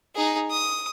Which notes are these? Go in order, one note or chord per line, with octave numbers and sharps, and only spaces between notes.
D#4 G#4
D#6